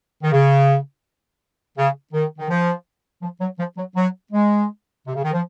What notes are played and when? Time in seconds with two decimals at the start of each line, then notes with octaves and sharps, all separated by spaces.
0.23 D#3
0.32 C#3
1.78 C#3
2.13 D#3
2.39 D#3
2.50 F3
3.22 F3
3.41 F#3
3.59 F3
3.77 F#3
3.96 F#3
4.32 G#3
5.07 C3
5.15 C#3
5.23 D#3
5.33 F3